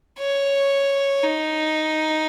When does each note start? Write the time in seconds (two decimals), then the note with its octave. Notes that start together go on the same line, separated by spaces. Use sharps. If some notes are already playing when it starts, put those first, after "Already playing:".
0.19 C#5
1.23 D#4